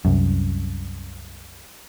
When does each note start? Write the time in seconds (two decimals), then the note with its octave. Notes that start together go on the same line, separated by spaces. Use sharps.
0.05 C2 F#2